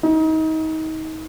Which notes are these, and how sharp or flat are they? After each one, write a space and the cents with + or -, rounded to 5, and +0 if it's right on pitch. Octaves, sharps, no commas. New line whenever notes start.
D#4 +30